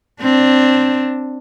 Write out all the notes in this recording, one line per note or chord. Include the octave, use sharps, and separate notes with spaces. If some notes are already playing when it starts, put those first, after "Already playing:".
C4 D4